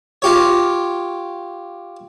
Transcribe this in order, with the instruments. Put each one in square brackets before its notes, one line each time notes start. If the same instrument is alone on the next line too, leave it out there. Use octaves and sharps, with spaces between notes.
[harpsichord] F4 G4 C#5